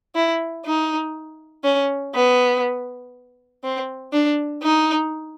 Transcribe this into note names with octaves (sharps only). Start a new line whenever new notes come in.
E4
D#4
C#4
B3
C4
D4
D#4